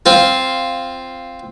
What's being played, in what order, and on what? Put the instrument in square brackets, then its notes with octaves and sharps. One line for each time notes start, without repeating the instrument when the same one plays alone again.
[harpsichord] C4 F4